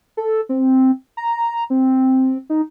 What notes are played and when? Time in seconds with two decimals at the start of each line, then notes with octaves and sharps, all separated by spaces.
0.17 A4
0.49 C4
1.17 A#5
1.70 C4
2.50 D#4